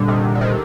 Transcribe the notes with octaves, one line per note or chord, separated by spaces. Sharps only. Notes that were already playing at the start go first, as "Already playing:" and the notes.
Already playing: A#2 D3 G3 D4
C3 D#3
D3
C3 D#3